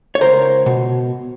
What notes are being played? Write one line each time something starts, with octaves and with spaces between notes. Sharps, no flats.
C#5
C#2 A#4 C5
B2